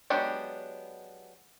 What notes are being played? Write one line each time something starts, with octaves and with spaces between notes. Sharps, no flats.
F#3 G#3 B3 D4 G4